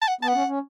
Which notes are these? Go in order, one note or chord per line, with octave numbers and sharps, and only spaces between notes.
A5
F#5
B3 A5
F#5
C#4
C#4